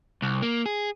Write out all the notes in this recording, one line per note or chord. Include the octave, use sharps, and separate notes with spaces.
C2
A#3
G#4